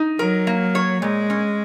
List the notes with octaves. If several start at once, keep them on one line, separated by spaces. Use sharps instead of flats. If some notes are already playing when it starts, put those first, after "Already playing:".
Already playing: D#4
F#3 A#4
A#3
C#5
A#2 G#3
C#4